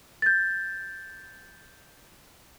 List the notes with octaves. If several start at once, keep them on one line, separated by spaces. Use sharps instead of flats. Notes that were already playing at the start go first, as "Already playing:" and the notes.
G6 A6